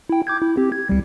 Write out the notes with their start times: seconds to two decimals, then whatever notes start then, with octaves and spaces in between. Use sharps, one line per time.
0.10 E4 G5
0.27 D6 G6 G#6
0.42 E4
0.57 C4 G4
0.72 G#6
0.89 C#2 G3